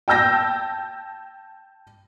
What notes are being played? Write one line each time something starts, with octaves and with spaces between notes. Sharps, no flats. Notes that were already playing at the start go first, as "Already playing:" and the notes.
G5 A5 E6 G6 A#6